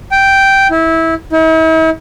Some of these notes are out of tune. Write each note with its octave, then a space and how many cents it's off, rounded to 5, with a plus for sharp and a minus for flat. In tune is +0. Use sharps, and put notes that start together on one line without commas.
G5 -5
E4 -20
E4 -45